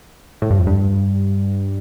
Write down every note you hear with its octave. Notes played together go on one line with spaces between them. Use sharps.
A2
G2
F2
G2